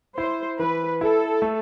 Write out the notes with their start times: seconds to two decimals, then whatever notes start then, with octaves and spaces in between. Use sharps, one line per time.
0.17 E4 C5
0.59 E3 B4
1.01 E4 A4
1.42 A3